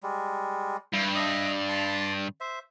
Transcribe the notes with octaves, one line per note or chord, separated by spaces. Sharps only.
G3 G#3
G2 E4
D#5 E5 D#6
A5 C6
C5 E5